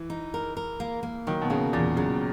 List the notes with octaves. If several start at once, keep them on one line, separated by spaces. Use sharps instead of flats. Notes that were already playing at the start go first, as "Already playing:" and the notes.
Already playing: E3
D#4
A#4
A#4
A#3
A#3
D#3 F#3
B2
C#3 A#3
E2 A#2
C#3 F#3